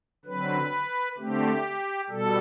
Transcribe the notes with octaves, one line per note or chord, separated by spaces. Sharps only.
D3 F#3 C4 B4
D3 A3 C4 G4
B2 G3 A4